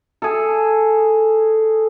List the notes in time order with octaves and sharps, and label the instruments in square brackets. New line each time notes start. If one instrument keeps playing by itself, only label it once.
[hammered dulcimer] G#4 A4